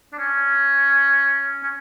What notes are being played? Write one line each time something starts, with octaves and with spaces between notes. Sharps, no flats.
D4
C#4
C#4